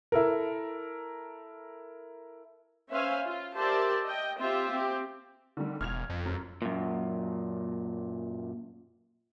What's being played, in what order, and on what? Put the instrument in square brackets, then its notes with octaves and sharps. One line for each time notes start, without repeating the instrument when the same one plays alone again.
[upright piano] E4 A4 A#4
[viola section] C#4 B4 C5 E5 F5 G#5
F4
G4 A#4 C5 D5 E5 A5
D#5 G5
C4 F4 G4 C5 E5
C4 G4
[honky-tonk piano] D3 D#3 G3
[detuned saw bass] E1 [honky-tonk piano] F6 G#6 F7
[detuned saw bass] F2
[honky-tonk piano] F#2
[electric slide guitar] F#2 A#2